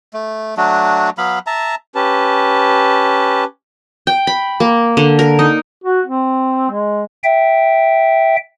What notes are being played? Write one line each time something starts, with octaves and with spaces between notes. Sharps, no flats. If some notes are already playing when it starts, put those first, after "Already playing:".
A3
F#3 A3 D4 F#4
F#3 B3 F5 B5
E5 A5 A#5
C#4 G4 B4 A5
G5
B5
A#3
D3
A#4
D#4
F#4
C4
G#3
E5 G5